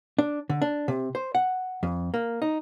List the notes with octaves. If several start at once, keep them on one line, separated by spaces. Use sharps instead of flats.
D4
D3
D4
C3
C5
F#5
F2
A#3
D#4